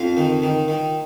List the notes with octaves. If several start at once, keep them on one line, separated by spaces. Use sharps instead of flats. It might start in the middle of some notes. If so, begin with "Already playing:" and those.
Already playing: F2 F4
D#3
D#3
D#3